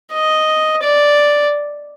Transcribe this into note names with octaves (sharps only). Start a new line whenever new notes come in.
D#5
D5